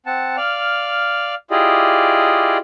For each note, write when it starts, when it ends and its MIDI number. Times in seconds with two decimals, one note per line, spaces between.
0.06 0.36 60
0.06 0.36 78
0.06 0.36 81
0.37 1.35 74
0.37 1.35 77
0.37 1.35 89
1.51 2.58 64
1.51 2.58 65
1.51 2.58 67
1.51 2.58 68
1.51 2.58 74
1.51 2.58 75